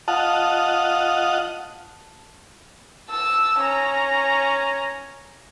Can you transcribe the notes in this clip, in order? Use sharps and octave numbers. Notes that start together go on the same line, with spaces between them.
F4 D#5 F#5 A5
A5 E6
C#4 A#5